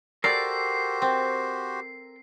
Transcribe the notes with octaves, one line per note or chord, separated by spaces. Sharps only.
F#4 G4 A4 A#4 C5 D5 C7
C4